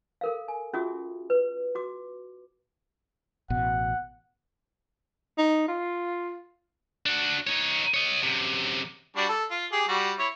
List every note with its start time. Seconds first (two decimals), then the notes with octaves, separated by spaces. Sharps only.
0.21 A4 A#4 F5
0.48 G#5
0.73 C#4 F4 F#4 G#4 E5 D#6
1.30 B4
1.75 F#4 D6
3.50 A1 B2 F#5
5.38 D#4
5.68 F4
7.06 D4 F#4
7.47 D#4 C#5
7.94 C#5 D#5
8.23 F#2 C3
9.16 G3 D4 F#4
9.29 A4
9.51 F4
9.72 G4 G#4
9.88 G3 F#4
10.19 E4 C#5